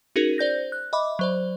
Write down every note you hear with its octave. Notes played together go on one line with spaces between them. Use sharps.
C#4 D#4 F#4 G#4 A#4
C5 D5 G6 A#6
F#6
D#5 E5 B5 D6
F#3 C5 D5